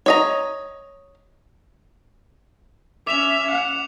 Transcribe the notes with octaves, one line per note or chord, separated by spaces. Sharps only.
C#5 D#5 A#5
C#4 E5 D6 E7 F7
F#5